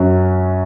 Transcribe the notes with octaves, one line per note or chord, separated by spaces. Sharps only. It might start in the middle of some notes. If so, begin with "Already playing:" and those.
Already playing: F#2 F#3 C#4